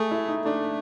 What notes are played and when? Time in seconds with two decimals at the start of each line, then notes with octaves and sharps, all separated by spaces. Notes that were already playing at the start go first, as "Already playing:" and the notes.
Already playing: A3 G#4
0.11 E4
0.28 D#4
0.45 A3 D4